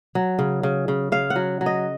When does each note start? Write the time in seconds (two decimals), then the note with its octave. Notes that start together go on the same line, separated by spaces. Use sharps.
0.15 F#3
0.39 C#3
0.63 C#3
0.88 C#3
1.12 C#3 F5
1.30 F#5
1.36 F#3
1.61 F#3
1.66 D#5